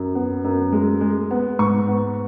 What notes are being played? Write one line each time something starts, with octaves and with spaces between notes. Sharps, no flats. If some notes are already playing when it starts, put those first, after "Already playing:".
Already playing: F#2
B3
F#2
G#3
G#3
B3
G#2 C#6
B3